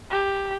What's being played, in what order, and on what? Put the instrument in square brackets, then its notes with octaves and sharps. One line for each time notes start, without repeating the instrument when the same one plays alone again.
[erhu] G4